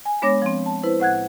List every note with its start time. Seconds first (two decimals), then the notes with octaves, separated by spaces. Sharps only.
0.05 G#5
0.22 G#3 B3 D4 C#5 D6 A#6
0.42 F3 C4
0.66 A5
0.83 E4 B4 C5
1.00 A2 F#5 F#6 G#6